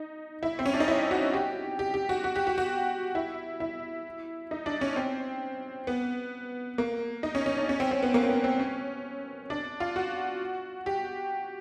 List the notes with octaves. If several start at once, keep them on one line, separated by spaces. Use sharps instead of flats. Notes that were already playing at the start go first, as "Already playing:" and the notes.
Already playing: D#4
E4
C4
C#4
D4
D#4
E4
F#4
G4
G4
G4
F#4
F#4
G4
F#4
F#4
E4
E4
D#4
D4
C#4
C4
B3
A#3
D#4
C#4
C#4
D4
C#4
C4
C4
B3
A#3
C4
B3
C4
C#4
D4
F4
F#4
G4